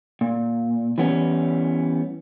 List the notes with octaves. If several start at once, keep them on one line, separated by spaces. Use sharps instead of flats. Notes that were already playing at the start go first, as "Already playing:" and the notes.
A#2
E3 G3 B3 C#4